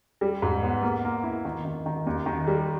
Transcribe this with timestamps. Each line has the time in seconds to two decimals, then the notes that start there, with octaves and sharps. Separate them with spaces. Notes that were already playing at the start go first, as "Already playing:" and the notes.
0.21 G3
0.42 G#2
0.63 B3
0.83 A#3
1.04 A#3
1.24 E4
1.45 D#3
1.65 D#3
1.86 D#3
2.06 D#2
2.26 D#3
2.47 G3